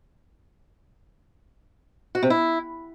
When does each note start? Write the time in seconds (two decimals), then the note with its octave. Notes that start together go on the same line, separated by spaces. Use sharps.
2.15 F#4
2.23 C3
2.30 E4